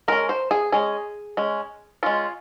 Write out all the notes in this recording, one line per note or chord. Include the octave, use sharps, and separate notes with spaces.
G#3 C#4 A#4
C5
G#4
G#3 C#4 G#4
G#3 C#4
G#3 C#4 F4